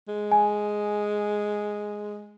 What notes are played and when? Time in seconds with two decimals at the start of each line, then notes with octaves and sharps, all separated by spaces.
0.08 G#3
0.32 G#5